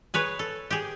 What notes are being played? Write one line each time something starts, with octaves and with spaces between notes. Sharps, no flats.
G#4 B4 C#5
A4
G4 G#4